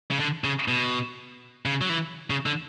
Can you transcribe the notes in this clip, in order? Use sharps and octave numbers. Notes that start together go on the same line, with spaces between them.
C#3
D3
C#3
B2
C#3
F#3
E3
C#3
D3